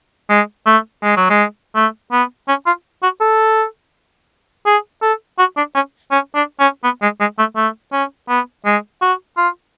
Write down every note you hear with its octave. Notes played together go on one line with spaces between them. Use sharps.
G#3
A3
G#3
F#3
G#3
A3
B3
C#4
F4
F#4
A4
G#4
A4
F#4
D4
C#4
C#4
D4
C#4
B3
G#3
G#3
A3
A3
C#4
B3
G#3
F#4
F4